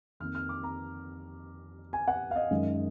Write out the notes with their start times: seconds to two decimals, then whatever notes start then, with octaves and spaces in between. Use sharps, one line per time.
0.20 F2 D#3 A#3 F6
0.35 F6
0.49 D6
0.63 A#5
1.93 G#5
2.08 F#5
2.31 F5
2.36 D#5
2.51 F#2 D#3 G#3